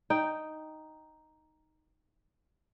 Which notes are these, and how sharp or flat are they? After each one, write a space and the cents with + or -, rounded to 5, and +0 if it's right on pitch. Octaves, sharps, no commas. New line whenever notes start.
D#4 +0 G5 +0